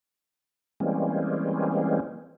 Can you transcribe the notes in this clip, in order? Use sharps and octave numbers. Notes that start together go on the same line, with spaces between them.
E3 G3 G#3 A#3 C4 C#4